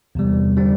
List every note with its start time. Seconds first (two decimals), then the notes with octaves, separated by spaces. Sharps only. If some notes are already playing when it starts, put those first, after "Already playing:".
0.15 E2 C3 G3
0.57 D3 G3 C4